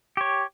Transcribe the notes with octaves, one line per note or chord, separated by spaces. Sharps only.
G4 C#5